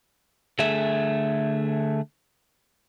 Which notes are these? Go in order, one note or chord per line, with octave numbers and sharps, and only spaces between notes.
D3 A3 G#4 E5